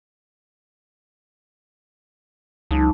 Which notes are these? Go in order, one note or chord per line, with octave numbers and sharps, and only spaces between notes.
C#2 F#3 D#4 A5